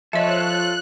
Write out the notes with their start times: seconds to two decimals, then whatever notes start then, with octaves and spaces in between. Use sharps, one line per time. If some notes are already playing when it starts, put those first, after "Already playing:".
0.13 F3 F4 A4 C#5 D#5 E5 F#6